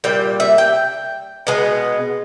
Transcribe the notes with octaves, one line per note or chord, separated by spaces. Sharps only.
A#2 G3 G5
E5
G5
B2 G#3 B3